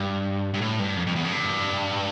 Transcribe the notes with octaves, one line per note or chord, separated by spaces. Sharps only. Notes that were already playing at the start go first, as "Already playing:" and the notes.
Already playing: G2
G2
A2
G2
F2
F2
E2
F2
G2